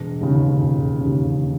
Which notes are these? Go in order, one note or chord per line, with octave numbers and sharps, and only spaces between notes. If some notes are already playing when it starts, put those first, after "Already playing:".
Already playing: E1
D#2 C#3
E1
D#2 C#3